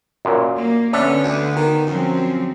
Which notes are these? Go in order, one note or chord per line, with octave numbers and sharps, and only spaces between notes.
F#2 A#2
A#3
D3 B3 C#4 D4 E5
D2
D#3
F#2 F3 F#3 C4